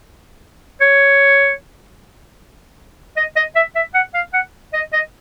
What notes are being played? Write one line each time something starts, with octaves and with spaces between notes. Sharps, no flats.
C#5
D#5
D#5
E5
E5
F#5
F5
F#5
D#5
D#5